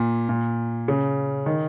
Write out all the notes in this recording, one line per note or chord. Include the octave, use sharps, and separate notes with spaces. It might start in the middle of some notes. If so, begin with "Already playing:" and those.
Already playing: A#2
A#2
C#3
D#3